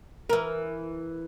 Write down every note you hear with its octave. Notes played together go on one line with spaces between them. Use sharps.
E3 A#4